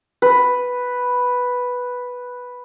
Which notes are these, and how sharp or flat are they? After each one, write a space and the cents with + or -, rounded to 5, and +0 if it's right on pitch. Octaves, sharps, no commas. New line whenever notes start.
B4 +0